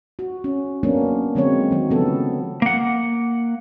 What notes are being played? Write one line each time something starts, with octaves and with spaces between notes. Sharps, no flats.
F#4
C#4
F#3 A#3 B3 C#4 D4
D3 F#3 G#3 C4 C#5
D#3 F#3
C#3 F3 B3 A4
A#3 F#5